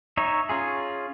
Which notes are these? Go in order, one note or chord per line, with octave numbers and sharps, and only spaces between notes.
D#4 C#5 E5
C#4 F4 G#4